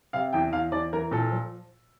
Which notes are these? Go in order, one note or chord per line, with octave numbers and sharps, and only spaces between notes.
C3 F5
E2 G5
E2 F5
E2 D5
E3 A#4
A#2 A4
F3